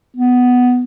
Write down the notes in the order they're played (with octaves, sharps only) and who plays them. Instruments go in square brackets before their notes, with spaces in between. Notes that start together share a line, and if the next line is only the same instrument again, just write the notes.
[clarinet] B3